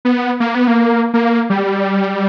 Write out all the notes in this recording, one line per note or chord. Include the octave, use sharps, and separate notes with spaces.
B3
A#3
B3
A#3
A#3
G3